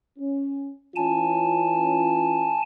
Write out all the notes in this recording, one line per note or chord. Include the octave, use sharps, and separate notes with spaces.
C#4
E3 C#4 F4 G#5 A5